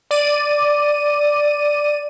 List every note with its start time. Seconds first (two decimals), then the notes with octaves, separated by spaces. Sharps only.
0.11 D5 D#7